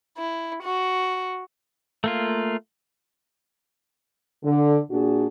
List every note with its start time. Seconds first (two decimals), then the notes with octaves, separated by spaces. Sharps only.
0.18 E4
0.64 F#4
2.04 A3 A#3 F4
4.45 D3
4.90 A#2 D4 F#4 G#4